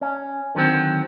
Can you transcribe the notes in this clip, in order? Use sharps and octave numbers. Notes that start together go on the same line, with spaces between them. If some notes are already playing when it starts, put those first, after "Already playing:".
C#4
D3 D#3 F#3 C4